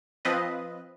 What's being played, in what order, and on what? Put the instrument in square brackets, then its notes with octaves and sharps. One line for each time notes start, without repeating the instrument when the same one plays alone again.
[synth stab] F3 C4 B4 D#5